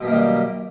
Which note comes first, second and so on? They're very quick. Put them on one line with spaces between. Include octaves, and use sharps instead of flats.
B2 F#2 A#3 D#3 G3